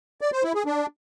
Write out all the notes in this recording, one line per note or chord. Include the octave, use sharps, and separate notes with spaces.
D5
C5
E4
G#4
D4